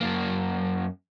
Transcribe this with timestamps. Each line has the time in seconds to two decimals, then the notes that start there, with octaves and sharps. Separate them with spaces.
0.01 F#2 A#3